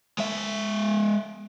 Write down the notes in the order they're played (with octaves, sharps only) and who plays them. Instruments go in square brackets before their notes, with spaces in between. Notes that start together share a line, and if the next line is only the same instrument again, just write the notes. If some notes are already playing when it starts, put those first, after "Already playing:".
[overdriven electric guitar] G#3 E5